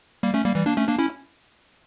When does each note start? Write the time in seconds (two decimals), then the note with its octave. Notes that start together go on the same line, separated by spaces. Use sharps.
0.23 G3 A#3
0.34 A3 C#4
0.44 G3 A#3
0.55 E3 G3
0.66 A#3 D4
0.77 A3 C#4
0.88 A#3 D4
0.98 C#4 E4